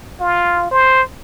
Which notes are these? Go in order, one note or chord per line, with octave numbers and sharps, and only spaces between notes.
F4
C5